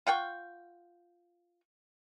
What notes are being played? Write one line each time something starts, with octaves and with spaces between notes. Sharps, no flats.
F4 F#5 G5 C#6